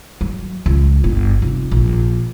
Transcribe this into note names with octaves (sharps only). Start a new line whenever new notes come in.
F#3
C#2
G1
F1
A#1